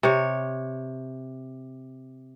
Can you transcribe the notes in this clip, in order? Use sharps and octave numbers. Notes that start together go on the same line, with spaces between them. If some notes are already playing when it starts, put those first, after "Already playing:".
C3 C#5